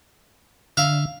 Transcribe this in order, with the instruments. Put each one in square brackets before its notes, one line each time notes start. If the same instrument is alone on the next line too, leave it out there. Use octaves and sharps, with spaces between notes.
[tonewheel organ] D3 [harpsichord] E5 F5